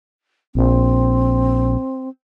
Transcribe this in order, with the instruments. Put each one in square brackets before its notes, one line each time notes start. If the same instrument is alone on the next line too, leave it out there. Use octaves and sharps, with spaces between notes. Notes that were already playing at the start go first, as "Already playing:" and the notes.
[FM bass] A#1 [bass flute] C4